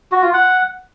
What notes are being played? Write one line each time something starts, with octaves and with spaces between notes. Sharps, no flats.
F#4
F4
F#5